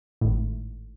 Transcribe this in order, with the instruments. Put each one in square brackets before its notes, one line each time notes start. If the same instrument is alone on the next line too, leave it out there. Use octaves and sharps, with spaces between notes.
[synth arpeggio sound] G#1 A2